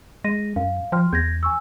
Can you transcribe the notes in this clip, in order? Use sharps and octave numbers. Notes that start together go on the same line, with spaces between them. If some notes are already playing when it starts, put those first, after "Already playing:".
G#3 A#6 D#7
F#2 F5
F3 G5 C6 F6
E2 G6 G#6 A#6
G#5 C#6 E6